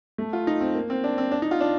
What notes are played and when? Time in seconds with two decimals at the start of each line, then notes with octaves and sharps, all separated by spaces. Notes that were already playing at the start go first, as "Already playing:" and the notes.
0.18 A3
0.33 F4
0.47 D#4
0.61 C4
0.75 A#3
0.90 C4
1.04 D4
1.18 C4
1.31 D4
1.42 D#4
1.51 F4
1.60 D4